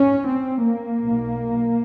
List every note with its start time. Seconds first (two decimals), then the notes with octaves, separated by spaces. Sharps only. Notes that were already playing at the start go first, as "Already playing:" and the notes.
Already playing: C#4
0.26 C4
0.63 A#3
1.00 B1 B2